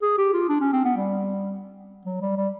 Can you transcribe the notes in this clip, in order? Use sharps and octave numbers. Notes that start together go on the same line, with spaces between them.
G#4
G4
F4
D4
C#4
C4
B3
G3
F#3
G3
G3